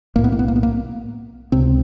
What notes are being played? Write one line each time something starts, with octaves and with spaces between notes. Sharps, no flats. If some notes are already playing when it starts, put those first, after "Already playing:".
B1 A2 A#3
B3
A#3
B3
A#3
B3
A#3
C#2 C3 C4